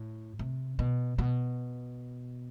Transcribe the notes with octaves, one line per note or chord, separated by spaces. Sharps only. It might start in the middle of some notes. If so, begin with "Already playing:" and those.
Already playing: A2
C3
B2
B2